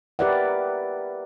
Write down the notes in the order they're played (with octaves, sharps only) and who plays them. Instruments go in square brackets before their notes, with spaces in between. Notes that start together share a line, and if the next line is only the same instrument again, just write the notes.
[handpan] G4 A#4 B4 D5 E5 F#5